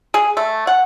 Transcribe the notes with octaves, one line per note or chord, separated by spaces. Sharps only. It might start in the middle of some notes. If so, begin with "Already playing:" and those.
G#4
A3
F#5